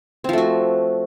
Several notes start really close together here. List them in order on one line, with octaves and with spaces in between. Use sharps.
C4 F3 A3 F#4